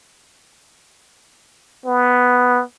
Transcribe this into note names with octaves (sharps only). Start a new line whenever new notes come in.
B3